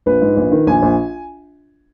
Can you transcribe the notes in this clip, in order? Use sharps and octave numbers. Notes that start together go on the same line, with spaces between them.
A#1 B4
G#2
A#1
D#3
A#1 G#5
A#1